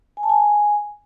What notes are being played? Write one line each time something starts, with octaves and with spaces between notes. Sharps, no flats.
G#5
A5
G#5